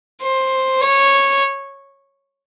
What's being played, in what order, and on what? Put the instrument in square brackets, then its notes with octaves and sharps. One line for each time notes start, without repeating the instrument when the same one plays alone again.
[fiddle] C5
C#5